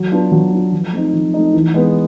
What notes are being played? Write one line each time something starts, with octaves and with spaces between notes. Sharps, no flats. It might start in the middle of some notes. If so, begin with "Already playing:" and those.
Already playing: F#3
B3 D4 F4
F#3
B3 D4 F4
F3
A3 C4 D#4
F3
A3 C4 D#4
E3
G#3 B3